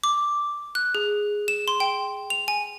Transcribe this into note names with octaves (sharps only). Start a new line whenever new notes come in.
D6
F#6
G#4
E7
C6
G5
F7
G#5